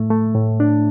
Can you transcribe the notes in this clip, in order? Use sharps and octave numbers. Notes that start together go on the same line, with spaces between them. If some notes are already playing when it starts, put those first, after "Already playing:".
Already playing: A2 A3
A3
A2
D4